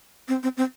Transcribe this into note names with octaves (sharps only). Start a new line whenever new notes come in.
C4
C4
C4